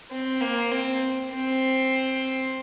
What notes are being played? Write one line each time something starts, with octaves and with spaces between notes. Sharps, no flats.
C4
A#3
C4
C4